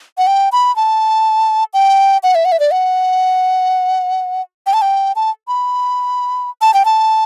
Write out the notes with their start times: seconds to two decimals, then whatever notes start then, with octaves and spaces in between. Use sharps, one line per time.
0.18 F#5
0.27 G5
0.52 B5
0.76 A5
1.74 G5
2.23 F#5
2.35 E5
2.45 F#5
2.52 E5
2.60 D5
2.71 F#5
4.67 G5
4.74 A5
4.82 G5
5.16 A5
5.48 B5
6.62 A5
6.74 G5
6.85 A5